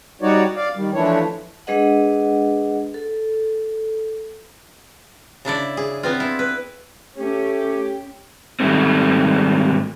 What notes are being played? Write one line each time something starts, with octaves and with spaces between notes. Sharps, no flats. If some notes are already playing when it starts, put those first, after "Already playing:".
G3 D#4 F#4 C#5 D5
D5 F5
D#3 G3
E3 F3 A3 D4 E4 C#5
G#3 D4 G#4 B4 D#5 F#5
A4
C#3 D4 E4 D5
G#4
B3 C4 F4
E4
B4
A3 C#4 G4
G#2 D#3 G3 A3 C4